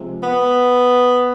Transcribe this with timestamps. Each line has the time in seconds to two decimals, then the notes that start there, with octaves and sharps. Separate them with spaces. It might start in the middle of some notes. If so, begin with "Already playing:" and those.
Already playing: C3 F3 G#3
0.21 B3